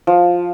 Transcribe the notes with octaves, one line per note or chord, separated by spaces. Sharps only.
F3